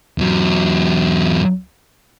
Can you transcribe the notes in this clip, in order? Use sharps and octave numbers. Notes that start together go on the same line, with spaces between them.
E2 F#3